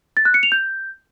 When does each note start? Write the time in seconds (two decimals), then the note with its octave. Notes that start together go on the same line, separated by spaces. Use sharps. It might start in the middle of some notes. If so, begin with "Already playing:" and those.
0.17 A6
0.25 F#6
0.34 C#7
0.43 F7
0.52 G6